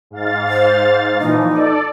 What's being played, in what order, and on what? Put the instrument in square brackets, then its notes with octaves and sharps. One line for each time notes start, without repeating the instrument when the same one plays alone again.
[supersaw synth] G#2 F5 A6
[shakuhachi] C5
[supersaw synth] A#2 E3 F3 [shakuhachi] D#4
[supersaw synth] A4 D5